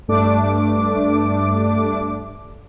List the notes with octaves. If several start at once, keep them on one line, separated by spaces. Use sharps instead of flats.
G2 A3 D4 D6